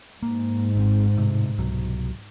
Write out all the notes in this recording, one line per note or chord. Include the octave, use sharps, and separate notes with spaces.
G#2 A#3
G#1 C4
A2 C3
C2 B2 F#3